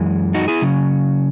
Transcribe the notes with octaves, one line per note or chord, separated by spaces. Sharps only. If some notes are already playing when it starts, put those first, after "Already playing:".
Already playing: F#2 E3 G#3
D#4 F#4
E4 G#4
C#3 F#3 C#4